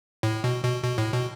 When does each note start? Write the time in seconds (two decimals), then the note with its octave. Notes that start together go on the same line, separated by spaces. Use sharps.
0.23 A2
0.44 B2
0.64 B2
0.84 B2
0.98 A2
1.13 B2